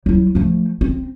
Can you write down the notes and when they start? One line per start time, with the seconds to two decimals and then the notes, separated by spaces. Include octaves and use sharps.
0.06 F#3 E4
0.35 F3 A3
0.81 C4